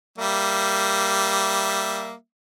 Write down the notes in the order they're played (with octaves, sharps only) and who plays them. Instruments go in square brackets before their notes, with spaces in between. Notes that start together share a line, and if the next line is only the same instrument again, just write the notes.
[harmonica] G3 A#3 E5